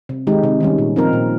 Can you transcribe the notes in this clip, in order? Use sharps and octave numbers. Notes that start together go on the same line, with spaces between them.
C3
D#3 G#3 D#4 G4
C3
D#3 G3 C#4
A#2
F3 C4 D#4 A#4
A#2